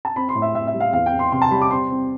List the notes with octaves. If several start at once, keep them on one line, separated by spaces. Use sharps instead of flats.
A5
C4 B5
C6
A2
E5
A2 E5
E5
G3
F5
E2 F5
G5
E2
C6
C3 C6
A5
G3 B5
D6
C4 C6
C4